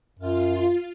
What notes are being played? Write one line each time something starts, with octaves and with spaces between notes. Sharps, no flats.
F#2 F4